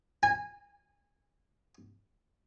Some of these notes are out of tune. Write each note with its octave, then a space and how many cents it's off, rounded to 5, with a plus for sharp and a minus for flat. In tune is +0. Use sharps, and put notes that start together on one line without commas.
G#5 -20